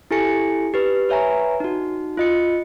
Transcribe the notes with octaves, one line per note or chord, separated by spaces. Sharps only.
E4 G4 A4 G#5 A#6 C#7
G4 B4
B4 C#5 E5 G#5 A#5
D#4 F#4
F4 D#5 C#7